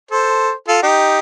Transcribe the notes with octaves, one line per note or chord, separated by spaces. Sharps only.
A4 C5
F4 A4
D#4 G4